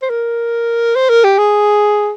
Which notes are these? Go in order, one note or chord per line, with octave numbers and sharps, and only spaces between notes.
C5
A#4
C5
A#4
G4
G#4